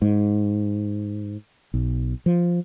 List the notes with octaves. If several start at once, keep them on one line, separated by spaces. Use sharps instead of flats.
G#2
B1
F3